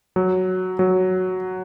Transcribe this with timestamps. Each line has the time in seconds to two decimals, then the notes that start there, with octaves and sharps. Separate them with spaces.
0.16 F#3
0.79 F#3